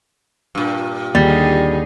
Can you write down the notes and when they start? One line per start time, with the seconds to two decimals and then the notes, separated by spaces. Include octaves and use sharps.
0.55 G2 A#2
1.15 D#2 D3 G3 D#4 G#4